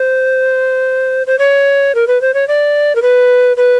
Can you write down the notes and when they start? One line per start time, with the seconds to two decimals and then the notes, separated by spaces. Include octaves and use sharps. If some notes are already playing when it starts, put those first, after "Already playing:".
Already playing: C5
1.27 C5
1.39 C#5
1.95 A#4
2.07 B4
2.21 C5
2.34 C#5
2.48 D5
2.95 A#4
3.02 B4
3.57 B4